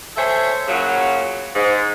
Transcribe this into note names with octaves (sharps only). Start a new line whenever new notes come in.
G#4 A4 C5 C#5 E5
A#2 C#3 F#3
G#2